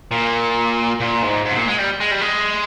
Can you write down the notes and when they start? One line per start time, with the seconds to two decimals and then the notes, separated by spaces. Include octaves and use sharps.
0.11 A#2
1.01 A#2
1.23 G#2
1.45 G#2
1.51 C3
1.56 A#2
1.68 G#3
1.78 G3
2.00 G#3
2.11 G3
2.21 G#3